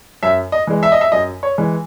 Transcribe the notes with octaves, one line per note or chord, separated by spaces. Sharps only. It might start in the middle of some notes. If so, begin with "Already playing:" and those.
F#2 E5
D#5
E3 G#3
E5
D#5
E5
F#2 D#5
C#5
E3 G#3